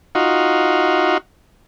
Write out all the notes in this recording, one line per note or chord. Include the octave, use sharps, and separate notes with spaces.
D#4 F4 F#4